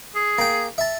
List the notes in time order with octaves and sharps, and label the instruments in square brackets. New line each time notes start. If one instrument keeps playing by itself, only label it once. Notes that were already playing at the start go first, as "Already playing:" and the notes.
[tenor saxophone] G#4
[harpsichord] A#3 G5
E5 A5